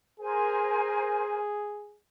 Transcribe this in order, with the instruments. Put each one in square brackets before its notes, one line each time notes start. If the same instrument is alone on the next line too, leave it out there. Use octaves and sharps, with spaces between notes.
[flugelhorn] G#4 [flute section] A#4 C5 G#5